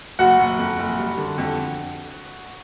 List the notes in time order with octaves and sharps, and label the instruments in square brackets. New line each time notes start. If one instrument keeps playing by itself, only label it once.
[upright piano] F#1 F#4 F#5
F#1
F2
F#1
G3
D3
F2